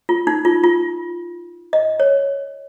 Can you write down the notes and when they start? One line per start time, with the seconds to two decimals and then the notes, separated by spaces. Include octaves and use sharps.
0.09 F4
0.27 D#4
0.45 F4
0.64 F4
1.73 D#5
2.00 C#5